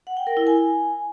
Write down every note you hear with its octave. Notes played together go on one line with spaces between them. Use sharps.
F#5
G5
A#4
E4
G#5